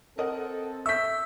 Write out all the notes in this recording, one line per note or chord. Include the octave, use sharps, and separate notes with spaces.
C4 A4 A#4 D#5 F#5
E5 C#6 E6 G6 B6